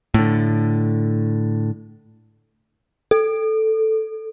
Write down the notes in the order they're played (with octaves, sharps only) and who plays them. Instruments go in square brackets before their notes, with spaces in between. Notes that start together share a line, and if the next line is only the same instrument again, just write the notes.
[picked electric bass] A2 D3
[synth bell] A4